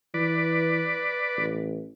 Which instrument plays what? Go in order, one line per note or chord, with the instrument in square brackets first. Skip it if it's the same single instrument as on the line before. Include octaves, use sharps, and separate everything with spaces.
[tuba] E3 [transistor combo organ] B4 D5
[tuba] A1